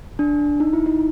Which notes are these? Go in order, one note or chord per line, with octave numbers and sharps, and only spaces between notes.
D4
D#4
E4
D#4